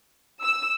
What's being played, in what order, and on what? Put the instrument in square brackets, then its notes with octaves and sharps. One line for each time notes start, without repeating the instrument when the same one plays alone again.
[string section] E6